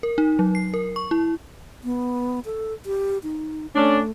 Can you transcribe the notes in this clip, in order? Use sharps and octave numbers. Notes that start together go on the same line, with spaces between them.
A#4
D#4
F#3
C7
A#4
C#6
E4
B3
A4
G4
D#4
A3 C#4 D4